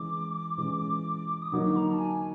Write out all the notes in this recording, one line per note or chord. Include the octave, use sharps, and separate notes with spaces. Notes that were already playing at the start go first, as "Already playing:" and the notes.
Already playing: E3 G#3 C#4 D6
E3 G#3 C#4
D#6
D3 F#3 A#3 D#4 F#4 D6
A#5
A5
G#5